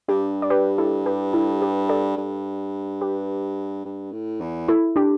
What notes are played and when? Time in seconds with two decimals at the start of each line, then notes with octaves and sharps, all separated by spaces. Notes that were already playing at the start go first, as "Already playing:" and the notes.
0.08 G2 D4 G4
0.42 D5
0.50 G4 B4
0.78 E4 A4
1.06 G4 B4
1.33 E4 A4
1.62 G4 B4
1.89 A4 D5
2.17 G2
3.01 G4 B4
3.85 G2
4.12 A2
4.41 E2
4.68 E4 A4
4.96 D4 G4